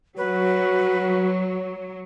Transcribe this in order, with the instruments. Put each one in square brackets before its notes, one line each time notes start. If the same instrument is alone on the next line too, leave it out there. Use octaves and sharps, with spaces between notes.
[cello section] F#3 [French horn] F#4 [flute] B4 [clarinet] C#5